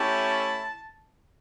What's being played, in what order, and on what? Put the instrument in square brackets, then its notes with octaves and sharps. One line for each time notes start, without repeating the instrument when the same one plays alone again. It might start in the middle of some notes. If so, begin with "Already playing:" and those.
Already playing: [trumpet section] A3 C#4 E4 G4 A5